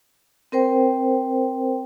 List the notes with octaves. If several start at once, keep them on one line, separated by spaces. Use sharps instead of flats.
C4 A#4 C5 G5